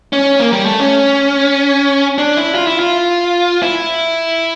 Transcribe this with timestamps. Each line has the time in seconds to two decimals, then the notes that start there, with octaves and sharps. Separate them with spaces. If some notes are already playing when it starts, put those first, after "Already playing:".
0.13 C#4
0.40 A#3
0.53 G3
0.66 A3
0.80 C#4
2.18 D4
2.37 E4
2.55 F4
2.67 E4
2.80 F4
3.62 E4